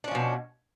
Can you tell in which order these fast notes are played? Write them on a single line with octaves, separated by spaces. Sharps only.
D4 C#4 F3 B2